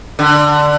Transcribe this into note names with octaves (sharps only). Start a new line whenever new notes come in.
D3